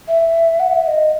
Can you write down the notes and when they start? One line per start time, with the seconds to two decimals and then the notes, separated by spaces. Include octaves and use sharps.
0.08 E5
0.60 F#5
0.74 E5
0.87 D#5